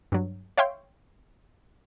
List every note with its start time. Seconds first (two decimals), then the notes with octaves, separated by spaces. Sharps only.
0.12 G2 F#3
0.58 C#5 E5 F5 G5 C6